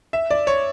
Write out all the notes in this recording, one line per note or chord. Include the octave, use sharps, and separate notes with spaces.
E5
D5
C#5